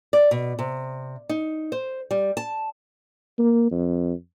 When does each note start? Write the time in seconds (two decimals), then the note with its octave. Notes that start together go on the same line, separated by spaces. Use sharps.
0.13 D5
0.31 B2
0.59 C3
1.29 D#4
1.72 C5
2.11 G3
2.37 A5
3.39 A#3
3.71 F2